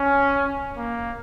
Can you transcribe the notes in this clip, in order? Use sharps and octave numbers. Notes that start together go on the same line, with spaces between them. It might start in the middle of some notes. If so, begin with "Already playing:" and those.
Already playing: C#4
A#3